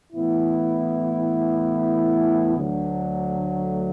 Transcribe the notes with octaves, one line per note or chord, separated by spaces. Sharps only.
A2 E3 B3 E4
D2 D3 F#3 A3